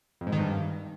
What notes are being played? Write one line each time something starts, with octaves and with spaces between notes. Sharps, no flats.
F2
G#2
D#3
G2